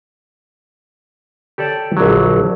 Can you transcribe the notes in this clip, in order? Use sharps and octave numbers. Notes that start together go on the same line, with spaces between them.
G4 A4 C#5 D5 A5
A#1 D3 F#3